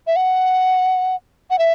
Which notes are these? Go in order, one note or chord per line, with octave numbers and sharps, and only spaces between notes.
E5
F#5
F#5
E5